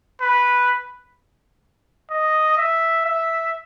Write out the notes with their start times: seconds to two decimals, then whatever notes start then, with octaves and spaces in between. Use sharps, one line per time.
0.21 B4
2.11 D#5
2.57 E5
3.05 E5